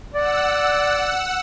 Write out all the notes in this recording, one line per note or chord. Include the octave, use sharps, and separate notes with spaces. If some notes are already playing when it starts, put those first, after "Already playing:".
D5 F#5 E6